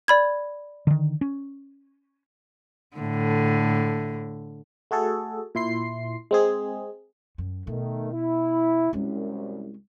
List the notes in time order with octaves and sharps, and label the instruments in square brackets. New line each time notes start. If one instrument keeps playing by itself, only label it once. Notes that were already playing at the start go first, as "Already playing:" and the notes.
[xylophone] D5 B5 G#6
[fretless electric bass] D3 D#3
C#4
[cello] A2 D3
[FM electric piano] A3 F#4 G#4 A4
A#2 E4 C6 C7
G#3 C4 G#4
[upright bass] F#2
[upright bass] B2 [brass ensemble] D#3 A3
[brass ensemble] E4
[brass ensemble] C2 F#2 [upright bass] G#3 C#4